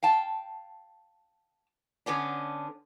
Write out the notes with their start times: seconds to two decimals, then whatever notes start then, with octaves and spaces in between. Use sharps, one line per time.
0.03 F5 G5 A5
2.06 D3 B3 C#4 D4